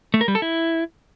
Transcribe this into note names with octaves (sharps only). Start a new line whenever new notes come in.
A3
A#4
G3
A4
E4